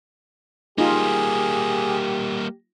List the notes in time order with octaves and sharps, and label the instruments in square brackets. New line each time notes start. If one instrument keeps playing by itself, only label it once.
[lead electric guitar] G3 A#3 [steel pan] D#4 F4 [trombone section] G4 [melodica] G#4